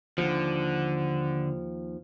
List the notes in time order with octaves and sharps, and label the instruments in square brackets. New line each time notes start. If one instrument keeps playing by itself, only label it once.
[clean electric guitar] D#2 F3 [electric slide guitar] D3